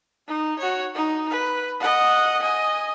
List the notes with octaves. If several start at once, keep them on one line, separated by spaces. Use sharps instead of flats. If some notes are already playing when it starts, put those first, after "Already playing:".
D#4
F#4 C#5
D#4
B4
D#5 F#5
D#5 G#5